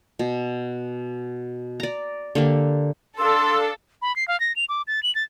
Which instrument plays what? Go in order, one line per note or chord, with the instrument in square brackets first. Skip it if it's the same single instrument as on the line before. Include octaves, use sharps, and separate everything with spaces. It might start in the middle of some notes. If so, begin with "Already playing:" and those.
[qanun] B2
D5 A#5
D3 A#3 G4
[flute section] D4 F5 E6 [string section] A4 [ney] C6
[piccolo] B5
C7
F5
A#6
F7
D6
A6
F#7
A6